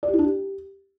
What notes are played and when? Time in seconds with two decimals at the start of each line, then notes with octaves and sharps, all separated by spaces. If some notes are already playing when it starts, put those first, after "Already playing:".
0.03 D5
0.08 G4
0.13 E4
0.19 D4
0.24 G4